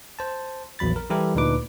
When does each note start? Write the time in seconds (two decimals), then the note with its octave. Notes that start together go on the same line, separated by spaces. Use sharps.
0.19 C5 A5
0.79 A#1 E2 F#3 B5 A6
0.96 A#4
1.10 E3 G3 E4 G4 A4 A#4
1.35 D2 A#2 D4 D#4 B4 D6